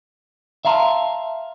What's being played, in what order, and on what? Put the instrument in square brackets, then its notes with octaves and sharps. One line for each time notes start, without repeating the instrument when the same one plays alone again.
[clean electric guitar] E5 F5 A5 A#5 C6